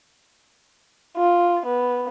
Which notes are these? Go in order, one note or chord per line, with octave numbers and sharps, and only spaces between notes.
F4
B3